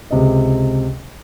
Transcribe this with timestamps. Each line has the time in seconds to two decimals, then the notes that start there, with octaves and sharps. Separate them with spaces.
0.11 C#2 C3 D#5